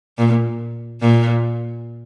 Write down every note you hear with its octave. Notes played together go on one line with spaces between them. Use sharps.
A#2
A#2